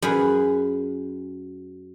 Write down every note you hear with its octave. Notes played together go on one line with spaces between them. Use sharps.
F#2 G#4 B4